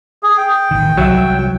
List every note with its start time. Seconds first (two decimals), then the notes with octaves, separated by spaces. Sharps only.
0.23 G#4
0.38 G5
0.71 A1 D#3
0.97 C2 F#3 E5